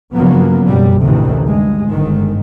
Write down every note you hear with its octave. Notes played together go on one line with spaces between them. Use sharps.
G2 C#3 F3 F#3 A#3 B3
F#2 B2 G3
A1 D2 C3 D#3 E3
G2 G#3
G1 G#2 D#3